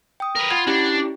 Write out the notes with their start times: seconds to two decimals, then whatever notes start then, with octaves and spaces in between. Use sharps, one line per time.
0.20 G5 D#6
0.36 A#4 B4
0.51 F4 F#5 B5 G#6
0.67 C#4 D4 E4 G4